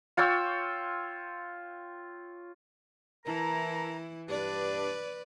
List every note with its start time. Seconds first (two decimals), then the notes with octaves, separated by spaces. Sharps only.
0.17 F4 C#5 G5 E6
3.26 E3 E4 A#4 A5 A#5
4.29 G2 D4 B4 D5